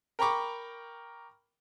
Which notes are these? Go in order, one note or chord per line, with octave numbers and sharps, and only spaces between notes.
A#4 G5 A#5 B5 C#6 D6